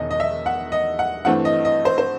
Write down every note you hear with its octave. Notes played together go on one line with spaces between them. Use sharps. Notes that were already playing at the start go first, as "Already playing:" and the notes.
Already playing: E1 E2 D#3 D#5
D#5
E5
F#5
D#5
F#5
G2 E3 A3 C4 F#5
D#5
D#5
C5
C5